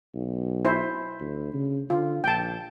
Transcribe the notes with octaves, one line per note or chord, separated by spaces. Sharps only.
B1
E4 C5
D2
C#3
D3 F4
A#1 G5 A5